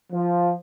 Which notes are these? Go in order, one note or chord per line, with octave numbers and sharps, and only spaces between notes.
F3